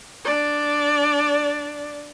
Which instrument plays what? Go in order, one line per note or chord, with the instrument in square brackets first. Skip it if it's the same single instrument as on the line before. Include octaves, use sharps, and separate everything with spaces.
[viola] D4 D5